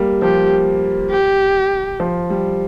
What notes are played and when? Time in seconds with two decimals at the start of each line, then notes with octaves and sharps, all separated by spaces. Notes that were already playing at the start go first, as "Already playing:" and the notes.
Already playing: G3 A#3
0.22 F3 G4
1.10 G4
2.00 F3
2.30 G3